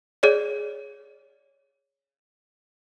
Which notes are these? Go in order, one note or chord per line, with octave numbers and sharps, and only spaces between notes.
G#4 C#5 D5